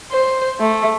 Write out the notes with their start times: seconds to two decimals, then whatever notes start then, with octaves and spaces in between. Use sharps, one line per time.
0.12 C5
0.60 A3